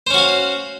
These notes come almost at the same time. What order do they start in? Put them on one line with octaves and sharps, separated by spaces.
C5 C#4 F#4 F5